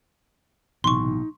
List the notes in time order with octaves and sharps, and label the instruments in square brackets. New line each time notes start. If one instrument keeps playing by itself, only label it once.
[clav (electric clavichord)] B1 [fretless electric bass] A2 C3 E3 [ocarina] D#4 [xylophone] C6 C#6